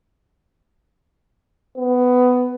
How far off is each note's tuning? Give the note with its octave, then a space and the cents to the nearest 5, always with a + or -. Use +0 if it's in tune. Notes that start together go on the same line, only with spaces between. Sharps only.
B3 +15